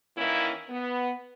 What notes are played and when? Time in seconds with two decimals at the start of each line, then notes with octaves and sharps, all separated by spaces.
0.16 D#3 E3 A#3 C#4 E4
0.69 B3